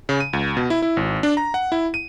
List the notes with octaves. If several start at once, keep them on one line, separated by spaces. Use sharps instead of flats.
C#3
D#7
C#2
B2
E4
E4
G#1
D4
A#5
F#5
E4
D#7